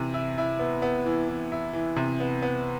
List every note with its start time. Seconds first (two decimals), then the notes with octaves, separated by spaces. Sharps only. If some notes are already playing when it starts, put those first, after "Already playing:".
Already playing: C3 E3
0.14 E4
0.38 E4
0.59 B3
0.82 B3
1.06 E3
1.29 E3
1.52 E4
1.73 E3
1.96 C3
2.20 B3
2.42 B3